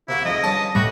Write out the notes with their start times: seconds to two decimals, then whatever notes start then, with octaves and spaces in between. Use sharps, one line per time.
0.09 C3 A#3 E4 F#4
0.25 F2 G#2 F3 D#5
0.44 G2 C#4 A5
0.75 A2 G3 F#4 G5